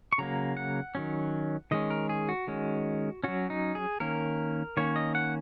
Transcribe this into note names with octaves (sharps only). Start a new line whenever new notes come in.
C#6
C#3 F#3 A#3 A#5
F#5
D#3 F#3 C#4
D#3 G#3 C#4 D#5
A#4
G#4
F#4
D#3 G#3 C#4
F#3 C#4 F#4
D#4
G#4
D#3 A#3 C#4 A#4
D#3 A#3 C#4 C#5
D#5
F#5